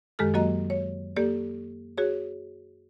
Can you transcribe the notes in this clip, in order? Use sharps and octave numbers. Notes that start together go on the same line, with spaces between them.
F#2 D#3 G#3 G4 A4 F6
F#3 A#3 F#4 D#5 A#5
C#5
A#3 G4 A4 D5
F#4 G#4 C#5